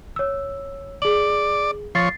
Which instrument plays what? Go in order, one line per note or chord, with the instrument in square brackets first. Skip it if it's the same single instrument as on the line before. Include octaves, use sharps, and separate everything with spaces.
[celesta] C#5 E6
[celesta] G#4 F#7 [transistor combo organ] D5
[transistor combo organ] F3 C#5 [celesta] A6 C7